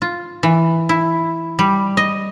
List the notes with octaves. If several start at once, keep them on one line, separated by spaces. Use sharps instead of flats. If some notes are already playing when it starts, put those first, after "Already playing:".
F4
E3
E4
G3
D#5